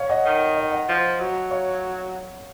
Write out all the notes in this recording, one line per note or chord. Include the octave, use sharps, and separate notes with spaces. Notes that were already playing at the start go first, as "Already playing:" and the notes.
Already playing: C#5 F5
D#5 F#5
D#3
D#5 F#5
D#5 F#5
F3
F#3
C#5 F5